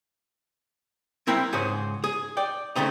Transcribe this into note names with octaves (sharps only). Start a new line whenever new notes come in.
C4 E4 A#4 G5 B5
C#2 G#2 G#4 C5 C#5
G#4
D5 G5
C#2 C#3 A3 C4 D#4